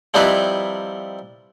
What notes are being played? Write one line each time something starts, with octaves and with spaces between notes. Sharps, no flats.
F3 G3 C4 D#4 E4 B4